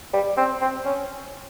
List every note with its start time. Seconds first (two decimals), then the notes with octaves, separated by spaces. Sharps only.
0.13 G3
0.37 C4
0.62 C4
0.85 C#4